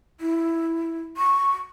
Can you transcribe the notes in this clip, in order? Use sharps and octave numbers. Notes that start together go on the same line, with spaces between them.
E4
C#6